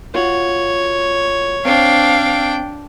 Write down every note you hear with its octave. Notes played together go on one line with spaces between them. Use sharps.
F4 F#4 C#5
C4 D4 F5 G5